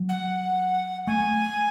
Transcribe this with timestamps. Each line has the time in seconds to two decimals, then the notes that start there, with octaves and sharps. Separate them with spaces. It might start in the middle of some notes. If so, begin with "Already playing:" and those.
Already playing: F#3
0.09 F#5
1.07 A3 G#5